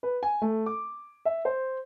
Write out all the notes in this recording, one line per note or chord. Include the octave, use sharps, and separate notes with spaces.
B4
G#5
A3
D6
E5
C5